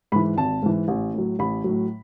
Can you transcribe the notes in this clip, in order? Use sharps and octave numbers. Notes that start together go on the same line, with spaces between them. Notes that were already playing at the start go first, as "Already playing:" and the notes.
G#2 E3 B5
G#1 A5
G#2 E3
A1
A2 F#3
A1 B5
A2 F#3